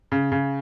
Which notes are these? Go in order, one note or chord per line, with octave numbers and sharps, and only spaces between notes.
C#3
C#3